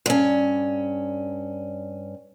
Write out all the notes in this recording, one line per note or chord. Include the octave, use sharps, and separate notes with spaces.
G2 C#4